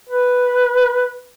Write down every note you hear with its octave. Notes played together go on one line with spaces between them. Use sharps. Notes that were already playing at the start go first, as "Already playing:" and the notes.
B4